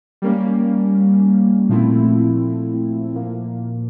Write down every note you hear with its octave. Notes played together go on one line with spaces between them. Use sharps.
G3 A#3 C#4
A#2 F3 A3 C4 E4
A#2 F3 A#3